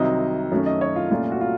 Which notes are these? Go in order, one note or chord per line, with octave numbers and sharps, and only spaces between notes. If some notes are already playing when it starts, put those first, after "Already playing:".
Already playing: C2 C3 D#3 F#3 C4 D#5
F#2 D#3 A3 C#4
D#5
C#5
F4
C2 A#2 A3 C#4 F4
F#4
F4